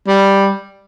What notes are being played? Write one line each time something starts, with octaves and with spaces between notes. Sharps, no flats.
G3